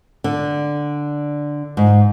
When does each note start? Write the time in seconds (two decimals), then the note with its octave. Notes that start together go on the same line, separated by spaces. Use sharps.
0.24 D3
1.77 G#2